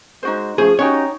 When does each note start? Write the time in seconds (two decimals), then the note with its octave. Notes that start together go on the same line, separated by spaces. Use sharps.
0.23 G#3 D#4 F#4 C5
0.58 F3 A3 C#4 G#4 C5
0.79 C#4 D#4 F#4 G4 C#5